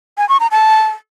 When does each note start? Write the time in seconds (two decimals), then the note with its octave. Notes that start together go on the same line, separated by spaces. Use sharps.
0.18 G#5
0.29 C#6
0.40 A#5
0.51 A5